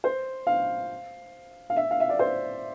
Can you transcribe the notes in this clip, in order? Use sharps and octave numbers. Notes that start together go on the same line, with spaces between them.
C5
F5
F5
E5
F5
E5
D5
C5